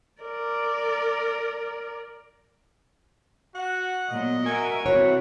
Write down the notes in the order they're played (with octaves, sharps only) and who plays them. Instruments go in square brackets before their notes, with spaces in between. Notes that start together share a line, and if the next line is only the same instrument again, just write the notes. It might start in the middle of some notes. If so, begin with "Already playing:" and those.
[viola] A#4 D5
[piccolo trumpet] F#4 [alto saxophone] F#5
[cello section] A#2 F#3 B3 [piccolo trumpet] D#5
[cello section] F#4 A#4 E5 [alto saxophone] G#5
[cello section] C3 E3 [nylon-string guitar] F#4 C#5 [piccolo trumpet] F#5